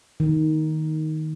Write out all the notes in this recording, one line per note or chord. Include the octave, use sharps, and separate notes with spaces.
D#3